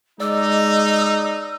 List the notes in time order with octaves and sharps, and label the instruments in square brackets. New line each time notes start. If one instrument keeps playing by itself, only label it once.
[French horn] G#3 [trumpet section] D#4 [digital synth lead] D5 [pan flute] E6